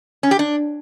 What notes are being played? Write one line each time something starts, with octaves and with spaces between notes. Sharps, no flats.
C#4
G4
D4